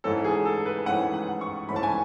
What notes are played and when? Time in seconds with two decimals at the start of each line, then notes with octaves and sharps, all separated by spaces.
0.04 G#2 E3 A3 C#4 A4
0.24 G#4
0.45 A4
0.66 B4
0.86 G#2 E3 A3 C#4 F#5
1.14 F#5
1.41 C#6
1.69 G#2 E3 A3 C#4 B5
1.76 A5
1.83 G#5